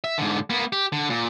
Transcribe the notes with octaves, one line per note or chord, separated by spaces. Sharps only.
E5
G#2 D3
A#3 B3
G4
D3
A#2